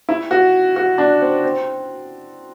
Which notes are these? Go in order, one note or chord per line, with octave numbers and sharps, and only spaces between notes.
E4
F#4
F#4
D4
C4
C4